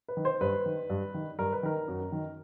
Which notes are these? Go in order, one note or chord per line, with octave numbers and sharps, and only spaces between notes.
B4
D#3
C5
G2 B4
D#3
G2
D#3
G2 A#4
B4
D#3 A#4
F#2
D#3